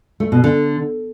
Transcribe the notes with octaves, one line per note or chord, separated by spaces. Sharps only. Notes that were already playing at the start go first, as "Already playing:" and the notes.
A3
B2
D3